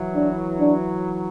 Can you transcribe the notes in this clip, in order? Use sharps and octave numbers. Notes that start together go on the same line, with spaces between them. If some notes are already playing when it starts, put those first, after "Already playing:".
Already playing: E3 F#3
D4
D4